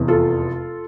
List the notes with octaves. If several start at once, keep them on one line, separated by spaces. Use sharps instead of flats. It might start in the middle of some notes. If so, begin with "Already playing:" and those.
Already playing: F1 E2 E3
F4 A4